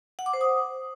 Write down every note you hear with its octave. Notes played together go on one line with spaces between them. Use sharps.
F#5
D6
C5
D#6